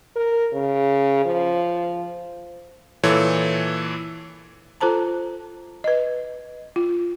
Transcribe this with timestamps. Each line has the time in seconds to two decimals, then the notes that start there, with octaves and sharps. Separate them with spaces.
0.16 A#4
0.54 C#3
1.26 F3
3.03 A#2 E3 A4 C#5
4.81 F4 A4 C5 A5 A#5
5.84 B4 D#5
6.76 F4